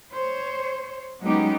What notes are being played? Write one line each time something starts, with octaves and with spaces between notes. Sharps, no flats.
C5 C#5
F#3 G#3 B3 C#4 D#4 G4